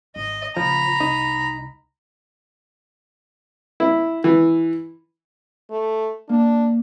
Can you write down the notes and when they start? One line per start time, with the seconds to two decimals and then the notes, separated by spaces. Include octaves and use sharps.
0.16 G#1 D#5
0.57 A#1 C#3 F3 A#5 B5
1.00 C2 D#4
3.80 E4
4.24 E3
5.70 A3
6.29 A#3 D4